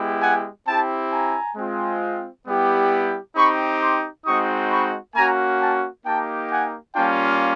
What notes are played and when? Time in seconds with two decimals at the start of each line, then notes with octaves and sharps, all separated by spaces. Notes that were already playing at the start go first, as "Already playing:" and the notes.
Already playing: G#3 B3 E4 G4
0.22 F#5 G#5
0.66 C4 E4 G4 G5 A5
1.12 G#5 A#5
1.56 G#3 C4 F4
2.47 G3 B3 E4 G4
3.36 C4 D#4 G4 B5 C#6
3.80 C6 D6
4.26 G#3 C4 D#4 F#4 C#6 D#6
4.71 B5 C#6
5.15 A#3 C#4 F#4 G#5 A#5
5.60 G5 A5
6.05 A#3 D#4 G4 G5 A5
6.50 F#5 G#5
6.95 G3 A#3 C#4 F4 G5 A5